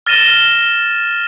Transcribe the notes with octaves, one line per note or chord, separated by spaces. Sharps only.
F6 A6 A#6 D#7 E7 G7